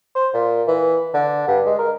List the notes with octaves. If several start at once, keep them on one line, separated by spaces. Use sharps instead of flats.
C5
A#2
E3
D3
G2
G#3
A#4